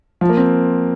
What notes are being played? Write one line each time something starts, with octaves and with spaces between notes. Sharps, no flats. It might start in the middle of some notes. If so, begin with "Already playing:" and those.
F3
A#3
C4